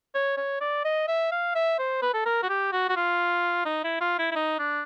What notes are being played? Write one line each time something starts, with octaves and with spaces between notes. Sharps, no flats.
C#5
C#5
D5
D#5
E5
F5
E5
C5
B4
A4
A#4
F#4
G4
F#4
F#4
F4
D#4
E4
F4
E4
E4
D#4
D4